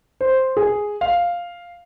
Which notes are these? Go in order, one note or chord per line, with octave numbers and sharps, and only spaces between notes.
C5
G#4
F5